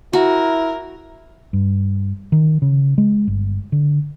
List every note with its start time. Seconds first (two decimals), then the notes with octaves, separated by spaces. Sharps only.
0.13 E4 F#4 A#4
1.53 G2
2.32 D#3
2.62 C#3
2.98 G#3
3.27 G1
3.72 D3